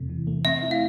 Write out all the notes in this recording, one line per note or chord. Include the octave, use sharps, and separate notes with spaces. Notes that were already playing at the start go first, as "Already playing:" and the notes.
Already playing: E2 C3 A3
E3
A3
C4 E5
E4
F5